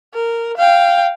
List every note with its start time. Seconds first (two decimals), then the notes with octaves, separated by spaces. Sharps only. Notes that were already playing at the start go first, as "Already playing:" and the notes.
0.14 A#4
0.57 F5 G5